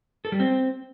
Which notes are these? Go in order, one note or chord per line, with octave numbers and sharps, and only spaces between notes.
A4
G3
C4